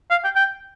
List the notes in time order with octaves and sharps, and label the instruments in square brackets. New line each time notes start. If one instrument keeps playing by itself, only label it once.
[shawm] F5
G5
G5